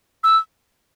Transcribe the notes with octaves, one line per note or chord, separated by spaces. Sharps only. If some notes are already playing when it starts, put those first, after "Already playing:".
E6